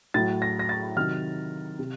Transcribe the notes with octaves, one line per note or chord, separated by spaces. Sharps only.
A2 F#3 A6
A#6
A#6
A6
C3 D#3 F#3 F6
C3